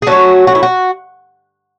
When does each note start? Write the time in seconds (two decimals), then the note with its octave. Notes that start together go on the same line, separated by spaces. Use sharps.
0.02 G#4
0.07 F#3 A3 C#4 F#4 A4
0.47 F#4
0.55 E4
0.63 F#4